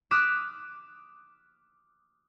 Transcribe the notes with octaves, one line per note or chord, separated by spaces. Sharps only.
D6 D#6 F6 F#6 B6 E7